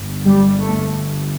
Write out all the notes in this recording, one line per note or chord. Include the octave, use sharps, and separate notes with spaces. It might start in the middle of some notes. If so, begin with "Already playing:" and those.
Already playing: G1 G2
G3
A3